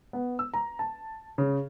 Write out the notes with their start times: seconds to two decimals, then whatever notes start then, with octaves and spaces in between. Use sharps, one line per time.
0.13 B3
0.39 E6
0.54 A#5
0.79 A5
1.38 C#3